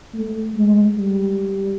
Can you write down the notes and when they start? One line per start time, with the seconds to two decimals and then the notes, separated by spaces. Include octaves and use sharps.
0.14 A3
0.55 G#3
0.96 G3